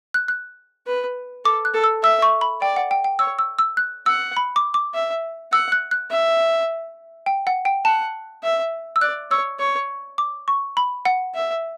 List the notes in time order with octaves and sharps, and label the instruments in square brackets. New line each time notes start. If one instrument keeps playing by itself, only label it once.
[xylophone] F#6
F#6
[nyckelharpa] B4
[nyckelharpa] A4 [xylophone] D6
[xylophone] F#6
[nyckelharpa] A4
[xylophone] E6
[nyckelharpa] E5 [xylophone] E6
[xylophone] C#6
B5
[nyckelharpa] D5 [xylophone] G5
[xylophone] F#5
G5
G5
[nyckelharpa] C#5 [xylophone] E6
[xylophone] E6
E6
F#6
[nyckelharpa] F#5 [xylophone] E6
[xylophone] B5
D6
D6
[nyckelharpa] E5
[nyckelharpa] F#5 [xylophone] E6
[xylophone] F#6
F#6
[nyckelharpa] E5
[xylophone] G5
F#5
G5
[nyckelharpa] F#5 [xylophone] A5
[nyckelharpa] E5
[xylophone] E6
[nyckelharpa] D5 [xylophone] F#6
[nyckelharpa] C#5 [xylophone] E6
[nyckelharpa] C#5
[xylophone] D6
C#6
B5
F#5
[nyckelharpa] E5